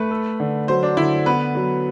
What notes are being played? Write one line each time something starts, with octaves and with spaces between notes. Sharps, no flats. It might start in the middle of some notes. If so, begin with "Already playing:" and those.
Already playing: A3 B4
A4
D3
F#3 C5
D4
D3 E4
B3 B4
F#3